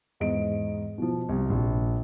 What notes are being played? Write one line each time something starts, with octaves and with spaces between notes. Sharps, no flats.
E2 G#2 D#5 D7
B2 F3
C2
A#1